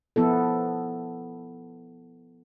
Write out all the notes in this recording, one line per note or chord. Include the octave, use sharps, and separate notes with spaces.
F3 B3 E4 A4